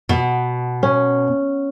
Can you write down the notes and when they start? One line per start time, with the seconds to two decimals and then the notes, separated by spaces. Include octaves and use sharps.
0.09 B2
0.83 C#4